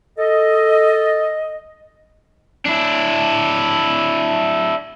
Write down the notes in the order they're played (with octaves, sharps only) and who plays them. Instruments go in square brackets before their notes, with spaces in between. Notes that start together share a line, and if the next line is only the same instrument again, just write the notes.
[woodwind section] A4 D#5
[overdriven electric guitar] D4 E4